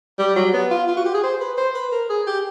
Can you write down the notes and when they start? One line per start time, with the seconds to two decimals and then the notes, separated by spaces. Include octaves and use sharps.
0.19 G3
0.36 F#3
0.54 B3
0.71 F4
0.88 F4
0.97 F#4
1.05 G4
1.14 G#4
1.23 C5
1.41 B4
1.58 C5
1.75 B4
1.92 A#4
2.10 G#4
2.27 G4